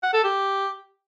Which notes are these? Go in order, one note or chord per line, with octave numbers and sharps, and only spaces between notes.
F#5
A4
G4